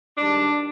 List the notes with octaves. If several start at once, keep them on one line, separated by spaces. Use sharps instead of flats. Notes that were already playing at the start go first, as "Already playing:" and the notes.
G#2 D#3 G3 D4